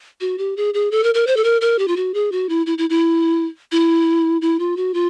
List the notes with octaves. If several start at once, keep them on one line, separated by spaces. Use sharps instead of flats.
F#4
G4
G#4
G#4
A4
A#4
A#4
C5
A4
A#4
A#4
G4
F4
F#4
G#4
F#4
E4
E4
E4
E4
E4
E4
F4
F#4
F4